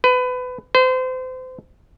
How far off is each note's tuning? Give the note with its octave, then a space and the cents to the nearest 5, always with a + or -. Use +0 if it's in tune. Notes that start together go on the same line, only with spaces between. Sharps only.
B4 +25
C5 -30